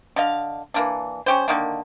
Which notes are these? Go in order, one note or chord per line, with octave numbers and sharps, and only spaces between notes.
D3 D#5 F5
E3 A#3 D4
C#4 G4 C5
D3 D#3 A#3